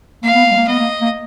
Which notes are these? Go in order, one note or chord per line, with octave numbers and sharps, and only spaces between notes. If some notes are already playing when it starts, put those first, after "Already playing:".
A#3 F5
B3
A#3
G#3
A#3
B3 D#5
A#3
A#3